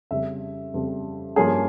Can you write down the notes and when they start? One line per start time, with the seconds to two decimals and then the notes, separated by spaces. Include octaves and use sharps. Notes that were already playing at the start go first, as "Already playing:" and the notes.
0.11 F2 C#3 G3 E5
0.74 F2 C#3 G3
1.36 G2 F3 A#3 C#4 G#4